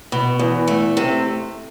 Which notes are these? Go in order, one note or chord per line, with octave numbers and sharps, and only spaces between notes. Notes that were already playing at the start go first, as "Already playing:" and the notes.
B2
E2
A3
C3